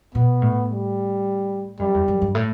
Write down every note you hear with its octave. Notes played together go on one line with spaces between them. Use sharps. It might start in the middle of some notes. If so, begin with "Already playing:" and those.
B2 B3
A2
G3
F#2 G3
E2
F#2
G2
A2